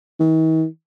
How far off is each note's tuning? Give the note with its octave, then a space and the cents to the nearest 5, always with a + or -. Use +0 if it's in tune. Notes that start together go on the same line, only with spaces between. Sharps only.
D#3 +45